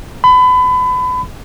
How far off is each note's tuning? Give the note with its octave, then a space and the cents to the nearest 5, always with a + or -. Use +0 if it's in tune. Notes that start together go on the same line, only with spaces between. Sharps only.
B5 +30